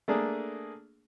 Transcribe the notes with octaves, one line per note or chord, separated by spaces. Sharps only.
A3 A#3 D4 G#4